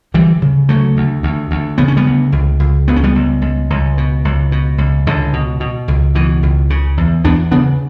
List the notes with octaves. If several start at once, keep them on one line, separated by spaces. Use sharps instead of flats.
D2 E3 G3
C#3
D2 F#3 A3
D2
D2
D2
C#3 B3
C#4
G3 B3
D2
C#2
C#2
C#2 B3
C#4
G3 B3
C#2
C#2
C#2
B2
C#2
B2
C#2
C#2 D3
B2
B2
C#2
B2 E3
C#2
C#3
E2
E2 B3 D4
C#3 B3 D4